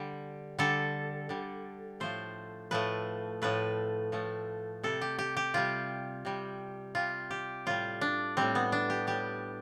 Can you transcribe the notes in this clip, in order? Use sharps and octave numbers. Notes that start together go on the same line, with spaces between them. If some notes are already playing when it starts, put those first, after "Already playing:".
Already playing: D3 G3
D3 G3 A4
D3 G3
A2 F3 A3 C5
A2 F3 A3 B4
A2 F3 A3 B4
A2 F3 A3
C3 G3 A4
G4
G4
G4
C3 G3 F4
C3 G3
C3 G3 F4
G4
A2 G3 F4
D4
A2 G3 C4
B3
D4
G4
A2 G3 G4